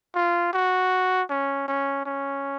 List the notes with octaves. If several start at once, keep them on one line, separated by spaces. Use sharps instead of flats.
F4
F#4
C#4
C#4
C#4